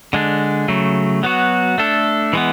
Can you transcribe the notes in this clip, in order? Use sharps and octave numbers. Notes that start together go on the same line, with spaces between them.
D3 G#3 D4
C#3 F#3 A3
F#3 B3 F#4
A3 D4 A4
E3 G#3 B3